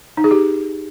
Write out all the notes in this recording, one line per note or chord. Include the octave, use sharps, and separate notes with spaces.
D#4
G#4
G4